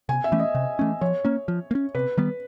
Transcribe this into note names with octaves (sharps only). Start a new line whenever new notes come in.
C3 G#5
E5
E3 A3 C#4
D#5
C3
E3 A3 C#4
F3 C#5
A#3 C#4
F3
A#3
C#4
C3 B4
D#3 G3 B3